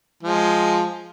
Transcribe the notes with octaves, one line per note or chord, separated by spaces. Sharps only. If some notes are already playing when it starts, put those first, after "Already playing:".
F3 G#3